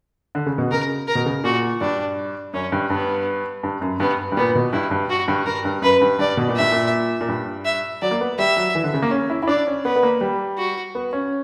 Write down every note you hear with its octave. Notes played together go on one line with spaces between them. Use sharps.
D3
C#3
B2
C#3 A#4
A#4
B2
C#3
A#2 F#4
G2 D4
F#2 C#4
G2
G2 B3
G2
F#2
G2 B3
G2
A#2 B3
B2
G2 E4
G2
F#4
G2
G2 A#4
G2
F#2 B4
G2
G2 D5
B2
A#2
G2 E5
A#2
A#2
G2
E5
F#3 D5
A#3
B3
G3 E5
F#3
E3
D3
C#3
A#3
C#4
E4
E4
D4 D5
C#4
B3 B4
B3
A#3
G3
F#4
B3
C#4